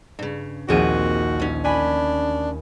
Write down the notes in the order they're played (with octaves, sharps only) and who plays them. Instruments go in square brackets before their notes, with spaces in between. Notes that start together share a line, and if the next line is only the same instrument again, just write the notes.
[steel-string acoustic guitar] G2 C#3
[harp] A#1 D#2 D#7 [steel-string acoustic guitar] C4 G#4 F#5 [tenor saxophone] F#4
[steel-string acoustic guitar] D2 C#4
[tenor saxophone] D4 [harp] G#5 B5